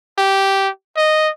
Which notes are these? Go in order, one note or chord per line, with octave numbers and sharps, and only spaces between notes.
G4
D#5